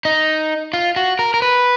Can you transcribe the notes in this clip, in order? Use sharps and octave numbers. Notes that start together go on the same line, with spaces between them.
D#4
F4
F#4
A#4
A#4
B4